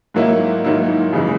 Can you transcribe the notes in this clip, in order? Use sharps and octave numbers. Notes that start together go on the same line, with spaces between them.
G#2 D#3 F#3 A#3 E4
G#2 D#3 F#3 A#3 E4
F#2 C#3 E3 G#3